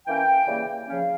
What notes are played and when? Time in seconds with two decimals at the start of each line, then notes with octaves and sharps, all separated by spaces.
0.06 E3 A#3 C#4 G5
0.47 C#3 E3 G3 A#3
0.87 C#3 F3 C#4 F5